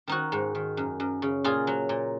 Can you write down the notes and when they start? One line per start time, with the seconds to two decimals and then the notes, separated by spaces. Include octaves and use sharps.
0.08 D#3 D#4 F#4
0.32 G#2
0.55 D#3
0.77 F#2
1.00 F#2
1.22 C#3
1.44 A#2 F4 G#4
1.67 F#3
1.89 A#2